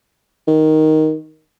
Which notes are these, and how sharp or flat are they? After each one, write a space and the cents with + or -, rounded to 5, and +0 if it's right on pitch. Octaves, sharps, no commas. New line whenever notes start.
D#3 +5